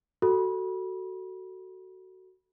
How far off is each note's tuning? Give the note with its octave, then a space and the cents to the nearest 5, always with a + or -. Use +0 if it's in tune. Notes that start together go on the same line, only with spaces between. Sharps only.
F#4 +15 A4 +15 B5 -25